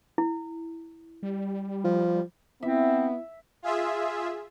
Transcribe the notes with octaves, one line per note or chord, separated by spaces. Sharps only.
E4
G3
F3
B3 C4 E4 E5
F4 G#4 E5